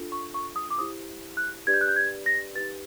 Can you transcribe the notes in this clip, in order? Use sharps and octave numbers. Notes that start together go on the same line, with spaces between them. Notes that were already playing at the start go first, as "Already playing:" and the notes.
Already playing: D4 F4 A4
C#6
C#6
D#6
D6
E4 G4 C5 D#6
F#6
D4 G4 B4 D5 G#6
G6
F#6
G6
G#6
A#6
D#4 G4 B4 A6